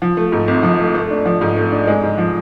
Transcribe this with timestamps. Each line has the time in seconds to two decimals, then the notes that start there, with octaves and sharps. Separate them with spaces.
0.02 F3
0.17 A3
0.32 G#2
0.48 G#1
0.63 F3
0.79 A3
0.95 A3
1.11 D4
1.26 F3
1.41 G#2
1.56 A3
1.72 D4
1.87 G#3
2.03 G#2
2.18 F3